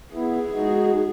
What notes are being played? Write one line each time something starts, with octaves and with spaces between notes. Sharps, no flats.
B3 E4 G#4
G#3 D#4 F#4